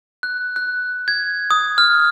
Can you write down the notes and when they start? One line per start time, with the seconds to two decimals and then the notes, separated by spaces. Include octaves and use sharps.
0.23 F#6
0.56 F#6
1.08 G#6
1.51 D#6
1.78 F6